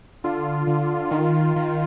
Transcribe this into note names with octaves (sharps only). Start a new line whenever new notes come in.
D3 F4
D3
D#3
D#3